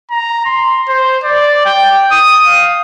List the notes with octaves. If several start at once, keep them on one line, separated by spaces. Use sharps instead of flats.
A#5
C6
C5
D5
G5
D#6
F5